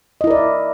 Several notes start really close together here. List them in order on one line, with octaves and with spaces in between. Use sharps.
D#5 E4 A#4 D5